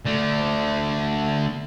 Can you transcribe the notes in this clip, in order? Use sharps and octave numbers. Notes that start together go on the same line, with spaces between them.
D3 A3